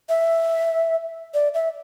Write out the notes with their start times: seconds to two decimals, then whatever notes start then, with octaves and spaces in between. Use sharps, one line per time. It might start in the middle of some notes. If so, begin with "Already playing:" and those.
0.09 E5
1.34 D5
1.54 E5